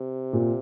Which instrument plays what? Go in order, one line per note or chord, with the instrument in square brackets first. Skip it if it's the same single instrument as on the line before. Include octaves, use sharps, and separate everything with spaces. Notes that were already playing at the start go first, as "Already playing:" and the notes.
Already playing: [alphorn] C3
[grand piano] A#2